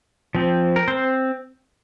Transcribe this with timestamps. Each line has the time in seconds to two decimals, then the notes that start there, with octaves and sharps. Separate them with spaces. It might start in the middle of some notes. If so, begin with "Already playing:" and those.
0.35 F3 C4
0.76 A#4
0.88 C4 C5